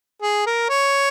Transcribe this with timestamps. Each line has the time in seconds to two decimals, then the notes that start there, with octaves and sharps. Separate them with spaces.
0.22 G#4
0.46 A#4
0.70 C#5